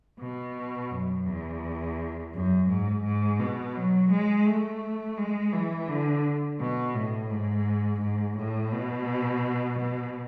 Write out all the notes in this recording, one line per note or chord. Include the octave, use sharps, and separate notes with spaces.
B2
F#2
E2
F#2
G#2
G#2
B2
F#3
G#3
A3
G#3
E3
D3
B2
A2
G#2
G#2
A2
B2
B2